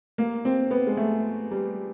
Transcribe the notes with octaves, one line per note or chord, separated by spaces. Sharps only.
A#3
C4
B3
G#3
A3
G3